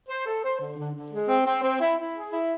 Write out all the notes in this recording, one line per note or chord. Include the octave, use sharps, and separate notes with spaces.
C5
A4
C5
D3
D3
D3
G#3
C4
C4
C4
E4
E4
G#4
E4